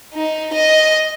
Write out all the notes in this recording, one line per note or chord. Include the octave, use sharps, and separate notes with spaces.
D#4
D#5